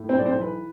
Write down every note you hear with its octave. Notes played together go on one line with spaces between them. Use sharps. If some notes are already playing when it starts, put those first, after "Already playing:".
Already playing: A2
C4 C5
B1 D5
C4 C5
E3 B4